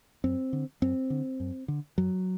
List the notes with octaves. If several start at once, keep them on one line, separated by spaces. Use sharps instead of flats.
F#2 C4
D3
F#2 C4
D3
F#2
D3
F#2 F#3